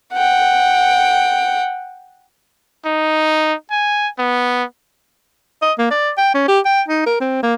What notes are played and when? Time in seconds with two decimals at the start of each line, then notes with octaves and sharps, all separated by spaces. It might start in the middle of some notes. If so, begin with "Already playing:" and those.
0.13 F#5 G5
2.86 D#4
3.71 G#5
4.19 B3
5.62 D#5
5.79 A#3
5.91 D5
6.18 G5
6.35 C#4
6.48 G4
6.65 G5
6.88 D#4
7.06 A#4
7.21 C4
7.43 A#3